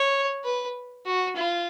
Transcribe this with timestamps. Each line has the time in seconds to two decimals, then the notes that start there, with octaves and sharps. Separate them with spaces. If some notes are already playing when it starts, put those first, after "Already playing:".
Already playing: C#5
0.44 B4
1.06 F#4
1.36 F4